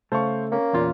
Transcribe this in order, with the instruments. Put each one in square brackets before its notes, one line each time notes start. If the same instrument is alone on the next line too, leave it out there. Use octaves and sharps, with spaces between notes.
[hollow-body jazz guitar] C#3 A3 A4 [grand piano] C5 F5 C#6
[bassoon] A#3 [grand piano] C#4
[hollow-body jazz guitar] E2 A#2 F4